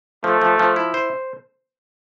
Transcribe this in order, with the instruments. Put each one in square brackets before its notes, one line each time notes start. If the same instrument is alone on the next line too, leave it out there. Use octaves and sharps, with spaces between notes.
[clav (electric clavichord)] F3 [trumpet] A3
[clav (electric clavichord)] F3
F3
E4
C5